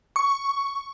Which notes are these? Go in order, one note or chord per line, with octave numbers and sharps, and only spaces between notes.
C#6